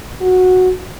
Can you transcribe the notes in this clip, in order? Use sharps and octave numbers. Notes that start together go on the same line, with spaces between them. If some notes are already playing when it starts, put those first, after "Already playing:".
F#4